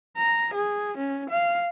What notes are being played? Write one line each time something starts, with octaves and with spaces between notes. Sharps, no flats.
A#5
G#4
C#4
F5